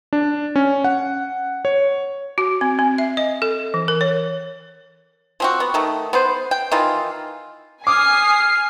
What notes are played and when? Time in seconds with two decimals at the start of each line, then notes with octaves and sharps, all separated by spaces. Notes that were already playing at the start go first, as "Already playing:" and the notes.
0.13 D4
0.56 C#4
0.84 F#5
1.65 C#5
2.38 F#4
2.61 C4
2.79 C4
2.98 E5
3.17 D#5
3.42 A4
3.74 E3
3.88 A#4
4.01 C#5
5.40 F3 C4 F#4
5.60 B3
5.74 D#3 A3
6.13 B3 B4 C5
6.51 G5
6.71 D#3 E3 F4
7.87 G#5 D6 D#6 F6 C7